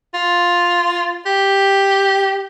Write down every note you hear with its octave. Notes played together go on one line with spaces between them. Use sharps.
F4
G4